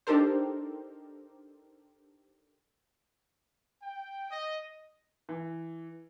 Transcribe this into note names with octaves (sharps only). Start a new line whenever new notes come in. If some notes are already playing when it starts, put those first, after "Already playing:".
D4 D#4 G4 A4 A#4 C5
G5
D#5
E3